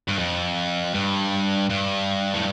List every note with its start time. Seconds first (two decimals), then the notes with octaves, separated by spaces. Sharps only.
0.09 G2
0.19 F2
0.94 G2
1.69 G2
2.34 A2